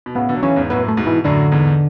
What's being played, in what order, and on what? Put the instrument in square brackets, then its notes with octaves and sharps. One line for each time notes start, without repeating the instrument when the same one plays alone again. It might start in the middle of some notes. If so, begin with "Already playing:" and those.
[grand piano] B2
[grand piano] A2 C#3 [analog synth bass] B3
[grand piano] B2 D3
F#3
[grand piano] C#3 E3 [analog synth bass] C#4
[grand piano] E2 G#2
[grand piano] F#2 A2 [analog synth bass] B3
[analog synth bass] A3
[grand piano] G#2 B2
[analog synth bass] E3
[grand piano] F#2 A2 [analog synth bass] D3
[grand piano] E2 G#2